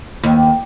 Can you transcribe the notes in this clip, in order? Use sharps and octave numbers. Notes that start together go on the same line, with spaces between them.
D#2